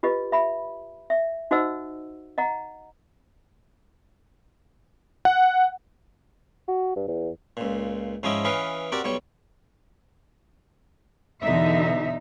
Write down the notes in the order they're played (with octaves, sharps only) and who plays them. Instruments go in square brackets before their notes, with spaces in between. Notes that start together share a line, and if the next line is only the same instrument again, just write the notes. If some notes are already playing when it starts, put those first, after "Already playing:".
[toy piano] F4 G4 B4 D#5
E5 B5
E5
D#4 F#4 C5 D#5 F#5 E6
D#5 F#5 A#5
[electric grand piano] F#5
[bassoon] F#4
G2
E2
[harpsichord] C#2 A#2
G#2 F3 C#4 E4 D#5 G5
E3 C#4 B4 D#5 F5 G5
C4 F#4 G4 A#4 D5
B1 G3 C#5 G5
[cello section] E2 B2 D3 E3 D#4 E5